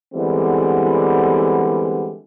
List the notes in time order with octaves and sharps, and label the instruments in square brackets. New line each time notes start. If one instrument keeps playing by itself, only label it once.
[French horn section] D3 E3 G3 G#3 B3 C4